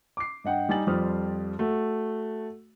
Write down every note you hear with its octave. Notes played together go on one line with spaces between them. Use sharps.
D6 C7
G2 D#5 F#5 G5
G3 D#4 G#5 A6 F#7
F2 F3 G3 C5 D#6 F6
A3 F#4